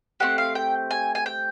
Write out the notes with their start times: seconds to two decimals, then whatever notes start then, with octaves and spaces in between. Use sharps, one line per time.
0.20 A3 C4 G4 F#5
0.38 F5
0.55 G5
0.91 G#5
1.15 G#5
1.26 G5